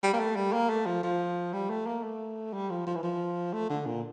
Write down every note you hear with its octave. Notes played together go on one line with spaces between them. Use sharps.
G3
A#3
A3
G3
A#3
A3
F3
F3
G3
A3
A#3
A3
G3
F3
F3
E3
F3
A3
D3
A#2